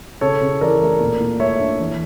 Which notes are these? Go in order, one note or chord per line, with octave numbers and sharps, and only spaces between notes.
C#3 A4 C#5
C#3
E3 A#4 D5
A3
A#2
A#2
A3 C#5 E5
D4
E3